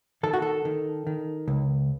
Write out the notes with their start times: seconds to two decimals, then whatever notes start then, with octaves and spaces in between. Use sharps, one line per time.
0.23 D#3 A4
0.33 F#4
0.42 A4
0.65 D#3
1.07 D#3
1.48 C#2